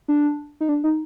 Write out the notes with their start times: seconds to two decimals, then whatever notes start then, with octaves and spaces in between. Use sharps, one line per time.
0.08 D4
0.61 D#4
0.69 D4
0.84 D#4